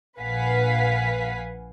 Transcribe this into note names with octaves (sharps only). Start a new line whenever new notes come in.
A#1 B4 F5 F#5 G#5 B6